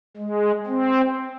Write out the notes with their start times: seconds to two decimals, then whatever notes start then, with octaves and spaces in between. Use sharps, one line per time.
0.17 G#3
0.67 C4